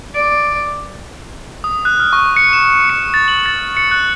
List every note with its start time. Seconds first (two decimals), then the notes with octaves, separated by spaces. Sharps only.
0.15 D5
1.64 D#6
1.85 F#6
2.00 F6
2.13 C#6
2.36 C#7
2.53 E7
2.90 C#7
3.14 A6
3.28 F#7
3.46 A6
3.77 C#7
3.91 F#6